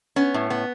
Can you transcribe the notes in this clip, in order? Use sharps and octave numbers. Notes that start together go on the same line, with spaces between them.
B3 C#4
A2
B3